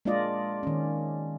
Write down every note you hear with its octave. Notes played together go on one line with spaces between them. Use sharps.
G#3 A#3 D4 F4 D5 D#5
D#3 C#4